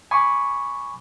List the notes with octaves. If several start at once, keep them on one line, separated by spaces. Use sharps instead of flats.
G#5 B5 C#6 D6